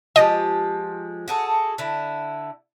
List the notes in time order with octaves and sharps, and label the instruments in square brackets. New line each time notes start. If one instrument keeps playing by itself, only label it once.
[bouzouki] F3 G#3 G4 [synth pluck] D#5
[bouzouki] F#4 G#4 A4
D3 E4